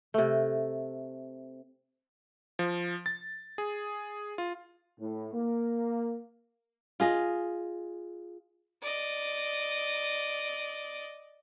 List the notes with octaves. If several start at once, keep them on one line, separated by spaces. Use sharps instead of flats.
C3 A3
F3
A6
G#4
F4
A2
A#3
F4 G#4 D#5
D5 D#5